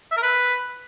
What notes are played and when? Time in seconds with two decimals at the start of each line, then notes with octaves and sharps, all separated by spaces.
0.11 E5
0.17 A#4
0.22 B4